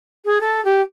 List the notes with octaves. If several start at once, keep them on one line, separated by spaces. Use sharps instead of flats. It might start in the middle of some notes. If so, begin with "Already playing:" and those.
G#4
A4
G4